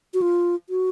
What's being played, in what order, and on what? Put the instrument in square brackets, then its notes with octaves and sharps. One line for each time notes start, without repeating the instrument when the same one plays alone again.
[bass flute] F#4
F4
F#4